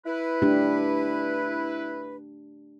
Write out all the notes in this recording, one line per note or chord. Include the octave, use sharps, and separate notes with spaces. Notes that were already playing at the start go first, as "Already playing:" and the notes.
E4 B4
A3 D4 G4